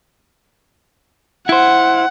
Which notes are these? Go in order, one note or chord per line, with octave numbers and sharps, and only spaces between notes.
E4 C5 F#5